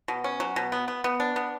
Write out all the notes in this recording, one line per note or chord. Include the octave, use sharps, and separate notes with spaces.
B2
C#4
F#3
B2
B3
B3
B3
D4
B3